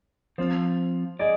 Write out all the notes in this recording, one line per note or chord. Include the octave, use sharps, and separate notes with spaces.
F3 C4 F4 C5
G#4 D5 D#5